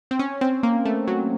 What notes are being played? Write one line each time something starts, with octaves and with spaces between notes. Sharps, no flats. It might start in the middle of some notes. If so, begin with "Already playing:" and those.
C4
C#4
C4
A#3
A3
F#3